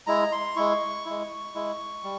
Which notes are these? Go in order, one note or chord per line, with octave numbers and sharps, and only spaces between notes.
G#3 E4 A#5
C6
G#3 E4 C#6
G#3 E4
G#3 E4
G3